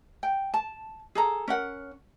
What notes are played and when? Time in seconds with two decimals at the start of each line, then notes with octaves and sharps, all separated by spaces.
0.23 G5
0.54 A5
1.15 G#4 A4 A#5
1.48 C#4 A#4 F#5